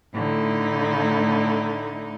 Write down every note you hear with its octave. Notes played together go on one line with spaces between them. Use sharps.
A2 D3 A3 D#4 E4